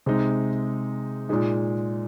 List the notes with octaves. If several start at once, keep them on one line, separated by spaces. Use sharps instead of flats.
C3 G#3 D#4
A#2 G#3 D#4